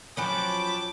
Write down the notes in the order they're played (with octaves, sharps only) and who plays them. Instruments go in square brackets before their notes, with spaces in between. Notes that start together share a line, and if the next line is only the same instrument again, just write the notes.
[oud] F3 F#3 C#4 [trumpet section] G5 A5 D6 [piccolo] B5